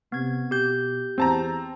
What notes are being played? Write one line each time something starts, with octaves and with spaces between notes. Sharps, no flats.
C3 B3 G#6
B2 G4 G6
E2 C4 A5 A#5